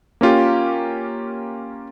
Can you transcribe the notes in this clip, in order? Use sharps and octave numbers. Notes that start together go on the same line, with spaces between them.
A#3 C#4 F4 G4